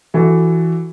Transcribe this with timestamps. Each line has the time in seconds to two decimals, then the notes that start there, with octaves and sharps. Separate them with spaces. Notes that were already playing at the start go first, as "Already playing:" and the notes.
0.14 E3 F#4 A4